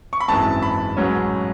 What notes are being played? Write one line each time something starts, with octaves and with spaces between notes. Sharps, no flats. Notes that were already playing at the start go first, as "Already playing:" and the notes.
C#6
B5
G#1 F#2 E3 G#3 A5
B5
A1 G#2 F#3 C#4